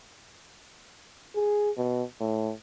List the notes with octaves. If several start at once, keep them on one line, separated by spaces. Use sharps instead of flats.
G#4
B2
A2